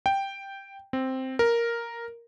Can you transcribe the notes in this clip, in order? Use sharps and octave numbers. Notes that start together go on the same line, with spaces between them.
G5
C4
A#4